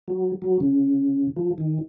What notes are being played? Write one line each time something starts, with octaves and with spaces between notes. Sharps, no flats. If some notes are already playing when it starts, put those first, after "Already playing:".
F#3
F#3
C#3
F3
D#3